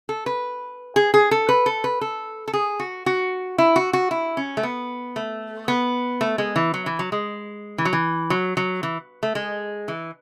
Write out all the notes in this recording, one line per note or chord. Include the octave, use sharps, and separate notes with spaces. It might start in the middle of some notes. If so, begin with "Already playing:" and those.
A4
B4
G#4
G#4
A4
B4
A4
B4
A4
A4
G#4
F#4
F#4
E4
F#4
F#4
E4
C#4
A3
B3
A3
B3
A3
G#3
E3
F#3
E3
F#3
G#3
E3
F#3
E3
F#3
F#3
E3
A3
G#3
E3